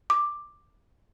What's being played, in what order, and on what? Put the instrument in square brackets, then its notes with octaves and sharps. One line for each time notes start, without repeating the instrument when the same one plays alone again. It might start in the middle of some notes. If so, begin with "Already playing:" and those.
[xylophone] D6